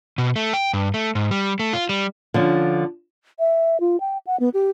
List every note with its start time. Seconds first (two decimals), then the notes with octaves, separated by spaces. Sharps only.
0.18 B2
0.36 A3
0.54 G5
0.73 G2
0.94 A3
1.15 G#2
1.31 G3
1.60 A3
1.73 F4
1.89 G3
2.34 D3 F3 C#4
3.39 E5
3.80 F4
4.00 G5
4.27 F#5
4.40 B3
4.54 G4